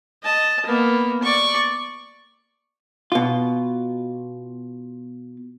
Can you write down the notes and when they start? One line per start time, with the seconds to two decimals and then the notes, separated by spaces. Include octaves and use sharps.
0.23 D#5 A5
0.66 A#3 B3
1.23 D5 C#6
3.12 B2 F4